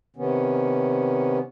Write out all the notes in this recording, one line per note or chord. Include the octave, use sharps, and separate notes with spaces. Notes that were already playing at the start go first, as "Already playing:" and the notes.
C3 D#3 B3 C#4